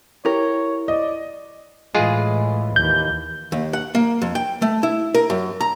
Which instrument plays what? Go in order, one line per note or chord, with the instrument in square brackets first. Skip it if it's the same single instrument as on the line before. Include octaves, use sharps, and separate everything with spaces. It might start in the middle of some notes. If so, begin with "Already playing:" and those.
[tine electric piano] E4 [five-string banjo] G4 A#4 [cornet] C#5
[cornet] D5 [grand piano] D#5
[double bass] A2 E3 [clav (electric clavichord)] G#3 F4 G#4
[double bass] D#2 E3 [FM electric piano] G6
[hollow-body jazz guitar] D#2
F#5
A#3
F2
G5
A3
E4
A#4
F#2
A#5